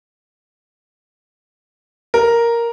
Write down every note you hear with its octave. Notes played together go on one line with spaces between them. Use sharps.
A#4